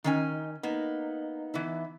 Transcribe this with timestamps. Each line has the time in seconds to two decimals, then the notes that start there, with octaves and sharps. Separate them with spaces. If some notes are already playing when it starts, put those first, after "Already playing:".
0.04 D#3 C#4 D#4 G#5
0.63 A#3 B3 D#4
1.54 E3 B3 E4